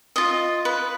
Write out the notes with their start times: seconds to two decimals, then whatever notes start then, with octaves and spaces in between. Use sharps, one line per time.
0.16 F4 D#5
0.65 B4